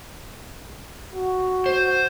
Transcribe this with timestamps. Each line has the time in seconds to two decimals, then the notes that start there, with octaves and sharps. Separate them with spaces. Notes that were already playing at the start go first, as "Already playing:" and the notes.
1.14 F#4
1.66 C5